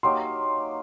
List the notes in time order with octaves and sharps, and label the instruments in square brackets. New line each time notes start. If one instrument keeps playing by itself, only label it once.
[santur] F#3 A#3 D#4 G4 [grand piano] C6